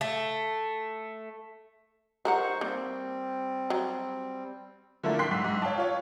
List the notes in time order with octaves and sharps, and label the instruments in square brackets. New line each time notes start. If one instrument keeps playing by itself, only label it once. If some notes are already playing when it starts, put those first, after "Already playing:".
[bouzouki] A3
[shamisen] G3 A#4 F#5 [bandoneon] D#4 C5 C#6
[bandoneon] G3 C4 [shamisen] A#3
[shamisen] F#3
[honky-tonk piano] D3 F3 A3 A#3 D4 E4
G5 C6 C#6 F#6 B6 C7
G#2 E6
G#2
C#5 F5 G5 A5
F4 C#5